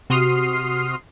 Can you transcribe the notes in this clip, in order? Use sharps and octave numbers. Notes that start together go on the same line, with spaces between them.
C3 F#4 C6 D#6 F6 C7